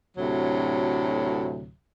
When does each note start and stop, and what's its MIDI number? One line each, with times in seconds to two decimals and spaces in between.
0.17 1.72 38
0.17 1.72 45
0.17 1.72 48
0.17 1.72 54